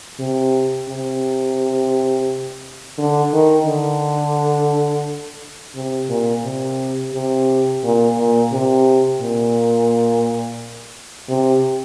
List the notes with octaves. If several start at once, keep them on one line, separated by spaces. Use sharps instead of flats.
C3
C3
D3
D#3
D3
C3
A#2
C3
C3
A#2
A#2
C3
A#2
C3